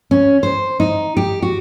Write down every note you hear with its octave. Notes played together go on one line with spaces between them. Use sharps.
C#4
C5
D#4
G4
F#4